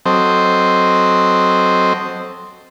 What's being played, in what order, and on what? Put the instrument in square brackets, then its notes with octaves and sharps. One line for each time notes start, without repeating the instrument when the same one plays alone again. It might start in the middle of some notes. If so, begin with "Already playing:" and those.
[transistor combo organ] F#3 C4 A4 C5 D#5